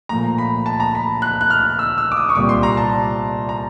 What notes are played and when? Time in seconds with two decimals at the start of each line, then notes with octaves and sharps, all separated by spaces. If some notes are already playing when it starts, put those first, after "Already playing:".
0.09 A#2 F3 A3 A#5
0.38 B5
0.66 A5
0.80 A#5
0.95 B5
1.22 F#6
1.41 F#6
1.50 F6
1.79 E6
1.98 E6
2.12 D6
2.17 D#6
2.29 C#6
2.35 C2 A#2 G3 D6
2.49 C6
2.63 A#5
2.77 A5
3.49 A#5